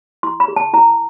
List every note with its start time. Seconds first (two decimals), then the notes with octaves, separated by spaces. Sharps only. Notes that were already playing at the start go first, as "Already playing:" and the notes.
0.23 E4 C6
0.40 B5
0.48 G#4
0.56 A5
0.73 E4 A#5